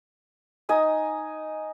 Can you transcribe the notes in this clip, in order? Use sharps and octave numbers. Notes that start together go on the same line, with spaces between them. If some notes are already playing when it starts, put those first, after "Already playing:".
D#4 D#5 G#5 D#6